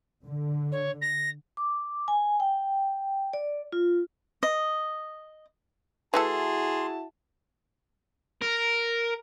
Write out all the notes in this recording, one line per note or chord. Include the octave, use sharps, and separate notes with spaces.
D3
C#5
A#6
D6
G#5
G5
D5
F4
D#5
E3 A3 E4 F#4 G#4 A4 A5 C6
A#4